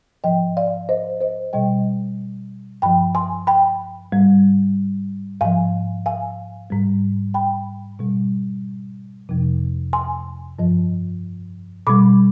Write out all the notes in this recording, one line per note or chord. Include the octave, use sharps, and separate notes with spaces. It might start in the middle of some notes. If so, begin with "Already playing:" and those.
G#2 F3 D#5 G5
D5 F5
C5 D#5
C5 D#5
B2 G3 D#5 G5
G2 F3 G5 B5
G#5 C6
G5 B5
G#2 G3
G#2 F3 F5 G#5
F5 G#5
G#2 G3
G5 B5
B2 G3
F2 C3 F3
G#5 C6
G2 F3
B2 G3 B5 D6